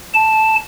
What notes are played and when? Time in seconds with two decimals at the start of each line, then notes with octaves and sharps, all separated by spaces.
0.14 A5